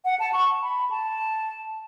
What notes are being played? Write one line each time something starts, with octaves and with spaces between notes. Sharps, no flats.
F#5
A5
C#6
B5
A5